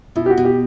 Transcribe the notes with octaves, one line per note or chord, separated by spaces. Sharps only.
B2 E4
G4
F#4
B2
G4